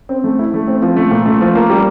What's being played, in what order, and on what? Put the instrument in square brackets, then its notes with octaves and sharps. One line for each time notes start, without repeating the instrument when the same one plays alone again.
[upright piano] C4
A3
E4
A3
C4
F3
A3
A#2
A3
F3
A#3
G3